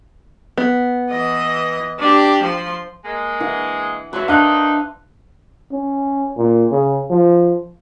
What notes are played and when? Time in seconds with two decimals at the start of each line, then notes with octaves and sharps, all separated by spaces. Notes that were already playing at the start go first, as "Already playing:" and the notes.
0.58 B3
1.10 E3 D#5
1.99 D4 G4
2.43 F3 C6
3.04 G#3 A#3
3.40 E3 F#5
4.13 E3 F#3 B4 C5 E5
4.28 D#3 D4 D#4 F5 F#6
5.72 C#4
6.38 A#2
6.71 C#3
7.10 F3